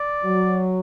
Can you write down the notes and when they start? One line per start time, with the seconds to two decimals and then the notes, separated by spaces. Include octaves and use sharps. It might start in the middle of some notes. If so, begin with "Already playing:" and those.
Already playing: D5
0.24 F#3